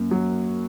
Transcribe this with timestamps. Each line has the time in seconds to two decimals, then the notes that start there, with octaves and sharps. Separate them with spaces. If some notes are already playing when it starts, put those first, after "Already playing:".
Already playing: F#2 A#3
0.11 F#3